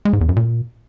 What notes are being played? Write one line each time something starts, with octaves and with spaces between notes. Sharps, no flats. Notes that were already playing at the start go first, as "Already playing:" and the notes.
G#3
G#2
E2
F#2
A#2